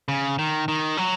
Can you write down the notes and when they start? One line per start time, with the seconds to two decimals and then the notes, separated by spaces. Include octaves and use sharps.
0.08 C#3
0.39 D#3
0.68 D#3
0.97 F#3